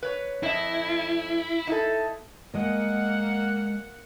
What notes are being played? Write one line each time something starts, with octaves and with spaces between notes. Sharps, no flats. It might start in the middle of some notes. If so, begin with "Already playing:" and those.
B4 C#5
F2 E4 D#5
D#4 E4 A4
G#3 A#3 D#5 F#5